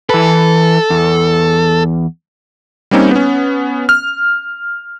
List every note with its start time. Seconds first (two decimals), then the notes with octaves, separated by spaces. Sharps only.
0.10 E3 A4 B4
0.90 E2
2.91 G3 A#3 C4 C#4 D#4
3.11 B3 C#4
3.89 F6